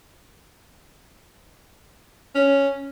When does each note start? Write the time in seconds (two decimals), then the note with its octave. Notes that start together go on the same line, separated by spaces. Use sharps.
2.35 C#4